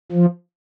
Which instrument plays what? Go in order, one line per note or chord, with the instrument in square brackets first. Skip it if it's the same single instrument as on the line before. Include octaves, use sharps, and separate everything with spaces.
[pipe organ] F3